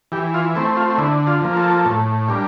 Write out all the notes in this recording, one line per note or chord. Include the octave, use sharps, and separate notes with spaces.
E3 G4
F4
A3 C4 E4
F4
D3 E4
F4
F3 A#3
A4
A2
G3 A#3 D4